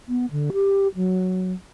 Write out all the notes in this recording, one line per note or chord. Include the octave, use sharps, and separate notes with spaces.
B3
D3
G4
F#3